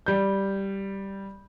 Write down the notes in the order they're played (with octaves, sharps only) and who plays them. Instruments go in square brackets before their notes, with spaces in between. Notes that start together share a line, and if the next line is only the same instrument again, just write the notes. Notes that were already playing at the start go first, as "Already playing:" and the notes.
[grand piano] G3 G6